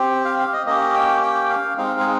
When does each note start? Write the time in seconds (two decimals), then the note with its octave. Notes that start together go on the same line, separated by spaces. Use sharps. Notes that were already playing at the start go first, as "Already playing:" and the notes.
Already playing: C4 G4
0.25 F5
0.39 F5
0.53 D#5
0.66 A#3 C#4 G4 D#5
0.94 G5
1.23 G5
1.50 F5
1.77 G#3 C4 D#4 F5
2.00 G#4